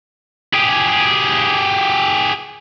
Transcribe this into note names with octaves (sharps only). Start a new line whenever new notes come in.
G4 G#4